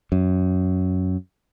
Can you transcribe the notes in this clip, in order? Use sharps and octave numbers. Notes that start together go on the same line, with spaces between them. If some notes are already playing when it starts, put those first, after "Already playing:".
F#2